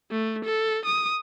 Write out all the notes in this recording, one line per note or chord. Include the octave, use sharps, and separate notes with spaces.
A3
A4
D#6